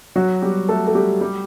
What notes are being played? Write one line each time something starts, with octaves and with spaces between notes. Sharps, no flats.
F#3 F#4
G3 G4
A3 A4
A4
G3 G4
G3 G4